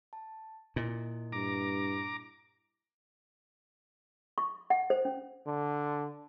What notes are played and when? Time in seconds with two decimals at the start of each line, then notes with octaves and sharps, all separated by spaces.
0.13 A5
0.76 A#2 E4 D#5
1.32 G2 A#5 D6
4.38 C#6
4.70 F#5
4.90 C5
5.05 C#4
5.47 D3